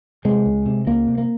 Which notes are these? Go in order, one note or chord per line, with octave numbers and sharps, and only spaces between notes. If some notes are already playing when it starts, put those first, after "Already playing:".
C3 G#3
C#2
C3
C#2 A#3
C3
A#3